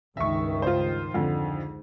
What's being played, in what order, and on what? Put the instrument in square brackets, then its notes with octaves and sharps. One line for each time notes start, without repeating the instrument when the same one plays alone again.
[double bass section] C#2 G2 D#3 [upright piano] E5 C#6
[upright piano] F4 C5
[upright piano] F2 D3 [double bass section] G#2